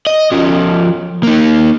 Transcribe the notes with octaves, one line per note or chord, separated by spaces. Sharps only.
D#5
F3 C#4
A#3 D#4